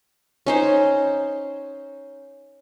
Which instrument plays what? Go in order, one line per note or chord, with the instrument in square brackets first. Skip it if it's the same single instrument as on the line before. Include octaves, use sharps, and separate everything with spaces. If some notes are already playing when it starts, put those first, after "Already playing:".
[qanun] C#4 D#4 C5